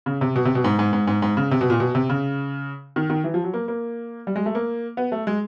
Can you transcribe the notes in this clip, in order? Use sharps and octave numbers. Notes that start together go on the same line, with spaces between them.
C#3
C3
B2
C3
B2
G#2
G#2
G#2
G#2
G#2
C#3
C3
B2
A#2
B2
C3
C#3
D#3
D#3
E3
F3
F#3
A#3
A#3
G3
G#3
A3
A#3
B3
A3
G#3